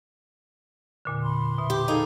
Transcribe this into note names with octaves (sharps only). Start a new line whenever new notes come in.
E2 A#2 D3
B5 C6
B2 E5
G4
D#4 G#4 A4 F5 G#5